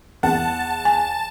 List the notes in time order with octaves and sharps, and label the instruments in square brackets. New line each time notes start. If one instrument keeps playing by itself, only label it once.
[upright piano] E2 [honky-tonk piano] F#5 [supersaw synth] A5
[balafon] G#5